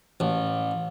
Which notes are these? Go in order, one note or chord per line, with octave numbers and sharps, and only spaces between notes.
A1